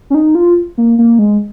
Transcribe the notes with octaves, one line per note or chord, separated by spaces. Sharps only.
C#4
D#4
F4
A#3
A#3
G#3